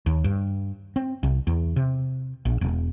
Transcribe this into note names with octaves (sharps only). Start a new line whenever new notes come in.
D#2
G2
C4
C2
E2
C3
A#1
E1